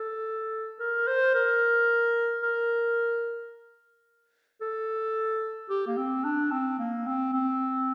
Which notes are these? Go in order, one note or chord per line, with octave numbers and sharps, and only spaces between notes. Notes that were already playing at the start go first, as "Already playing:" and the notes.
Already playing: A4
A#4
C5
A#4
A#4
A4
G4
A#3
C4
D4
C4
A#3
C4
C4